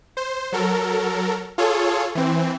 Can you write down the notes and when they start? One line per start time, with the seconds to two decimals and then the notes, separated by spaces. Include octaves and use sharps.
0.17 C5
0.52 F#3 A4 A#4
1.58 F4 G#4 A4 C#5
2.15 E3 C4